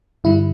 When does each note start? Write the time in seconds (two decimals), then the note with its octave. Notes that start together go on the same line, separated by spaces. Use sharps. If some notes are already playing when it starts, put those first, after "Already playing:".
0.24 G2 D3 G3 E4